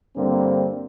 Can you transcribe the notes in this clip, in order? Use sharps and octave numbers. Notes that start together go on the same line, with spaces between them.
G2 D3 G3 A#3 C4